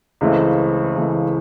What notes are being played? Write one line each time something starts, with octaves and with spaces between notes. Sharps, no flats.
C#2 C#3 E3 A3 C4
C#2 C#3 E3 A3 C4